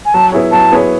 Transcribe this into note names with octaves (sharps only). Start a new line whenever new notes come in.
G#5
F#3 A5
B3 E4 G#4 C#5
F#3 A5
B3 E4 G#4 C#5